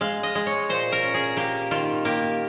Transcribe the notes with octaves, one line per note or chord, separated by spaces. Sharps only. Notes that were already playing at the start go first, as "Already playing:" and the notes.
G#3 F5
D#5
G#3
C#5
A#2 C5
A#4
C#4
G#4
A#3 G4
D#3 F4
A#3 G4